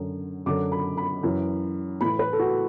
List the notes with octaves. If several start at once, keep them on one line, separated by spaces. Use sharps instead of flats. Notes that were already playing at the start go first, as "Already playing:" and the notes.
Already playing: F#2 D3
F#2 D3 D6
B5
B5
F#2 E3
A2 E3 B5
B4
A4
F#4